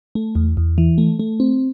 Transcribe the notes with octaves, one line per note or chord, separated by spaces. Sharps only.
A3
E2
E2
E3
A3
A3
C4